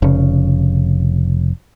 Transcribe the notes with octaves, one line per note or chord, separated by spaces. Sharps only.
F1 C#3